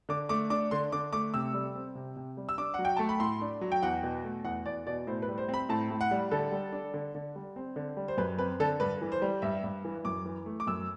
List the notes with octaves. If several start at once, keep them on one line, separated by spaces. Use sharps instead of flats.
D3 D6
A3 D6
D4 D6
D3 C6
D3 D6
A3 D6
C3 E6
G3
C4
C3
C3
G3
E6
D4 D6
F#3 F#5
G5
A3 A5
B5
A2 C6
D4
F#3
G5
E2 F#5
B2
A3
E2 F#5
E2 D5
B2 D5
A2 C5
B4
G3
C5
C4
B5
A2 A5
A2
F#5
G3
D3 A4
G3
D4
D3
D3
G3
C4
D3
G3
C5
F#2 B4
C4 B4
D3 A4
G2 B4
E3
C5
G3
G2 E5
G2
E3
F#2 D6
E3
A3
D6
F#2 E6